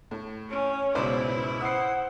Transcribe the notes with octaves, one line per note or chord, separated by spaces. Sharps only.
A2
C#4 C#5
C#2 G#2 B2 E4 B4 C5 D5
C5 F#5 D#6 E6 C7